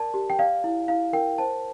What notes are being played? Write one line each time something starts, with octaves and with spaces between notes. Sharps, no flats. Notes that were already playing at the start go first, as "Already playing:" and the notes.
Already playing: A#4 D5 A5
G4
G5
D5 F5
E4
E4 F5
A#4 G5
C5 A5